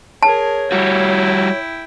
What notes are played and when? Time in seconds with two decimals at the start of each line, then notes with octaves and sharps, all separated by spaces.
0.23 G#4 A#4 C#5 A5
0.72 G3 E4 F#4 G5